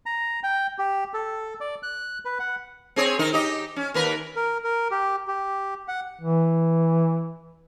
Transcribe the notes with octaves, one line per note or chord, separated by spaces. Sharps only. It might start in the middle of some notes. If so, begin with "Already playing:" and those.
A#5
G5
G4
A4
D5
F#6
B4
F#5
C4 G#4 C#5
D#3 D#4 A#4
D#4 G4 D#5
C#4
D#2 A#4 B4
A#4
A#4
G4
G4
F#5
E3